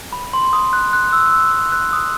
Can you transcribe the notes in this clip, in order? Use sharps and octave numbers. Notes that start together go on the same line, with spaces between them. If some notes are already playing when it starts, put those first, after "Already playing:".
B5
C6
D#6
F#6
F#6
E6
E6
E6
F#6
D#6